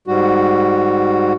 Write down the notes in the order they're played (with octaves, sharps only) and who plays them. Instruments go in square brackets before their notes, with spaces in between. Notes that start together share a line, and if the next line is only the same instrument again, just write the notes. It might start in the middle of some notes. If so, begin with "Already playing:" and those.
[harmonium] G#2 G3 F#4